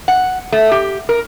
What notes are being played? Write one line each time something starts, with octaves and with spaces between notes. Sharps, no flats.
F#5
A3
G4
A#4